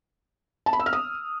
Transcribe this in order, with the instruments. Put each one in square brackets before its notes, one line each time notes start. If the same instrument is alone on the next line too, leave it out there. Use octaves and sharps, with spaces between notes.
[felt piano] A5
B5
E6
F6
D#6